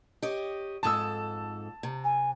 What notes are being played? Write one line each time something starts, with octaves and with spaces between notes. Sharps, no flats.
G4 C#5 D#5
F2 G#2 A4 A5 D#6 E6
C3
G#5